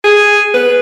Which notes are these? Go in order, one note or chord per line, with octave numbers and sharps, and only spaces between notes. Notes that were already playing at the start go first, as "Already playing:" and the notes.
G#4
B4